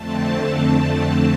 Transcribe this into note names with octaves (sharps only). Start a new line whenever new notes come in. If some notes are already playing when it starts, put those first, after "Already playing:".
Already playing: F2 D3 A3 C4 A5